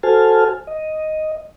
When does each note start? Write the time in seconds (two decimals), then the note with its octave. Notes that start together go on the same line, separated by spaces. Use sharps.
0.03 F#4 A4 C5 G#5 A5 F6
0.67 D#5